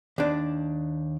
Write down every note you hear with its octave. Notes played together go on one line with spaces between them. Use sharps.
D#2 D4